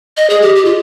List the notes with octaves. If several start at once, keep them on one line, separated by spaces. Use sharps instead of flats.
D#5
G#4
G4
G4
F4